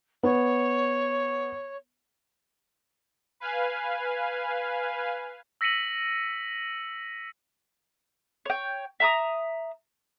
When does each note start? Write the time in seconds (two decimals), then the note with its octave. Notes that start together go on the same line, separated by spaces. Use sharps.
0.23 B3 C#5
3.40 B4 F5 G#5
5.61 E6 A#6 B6 C#7 D#7 F#7
8.45 C#5 G5
9.00 E5 A#5 D#6